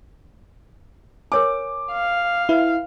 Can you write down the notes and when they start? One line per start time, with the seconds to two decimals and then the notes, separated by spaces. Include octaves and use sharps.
1.32 A#4 C#5 G#5 D6
1.92 F5
2.49 E4 B4